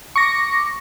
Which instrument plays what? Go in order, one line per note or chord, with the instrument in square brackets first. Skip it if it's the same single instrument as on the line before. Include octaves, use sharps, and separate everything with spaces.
[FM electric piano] C#6 D6 A#6